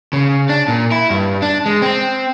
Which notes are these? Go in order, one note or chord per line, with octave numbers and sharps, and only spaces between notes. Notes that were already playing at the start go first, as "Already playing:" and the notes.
C#3
D4
A#2
E4
G2
D4
G#3
C4